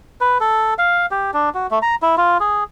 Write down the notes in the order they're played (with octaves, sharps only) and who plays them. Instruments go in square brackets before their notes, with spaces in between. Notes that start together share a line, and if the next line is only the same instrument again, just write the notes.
[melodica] B4
A4
F5
G4
D4
F#4
A3
A#5
E4
F4
G#4